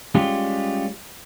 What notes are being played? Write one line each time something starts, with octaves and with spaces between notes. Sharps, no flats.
G3 G#3 C#4 F4 G4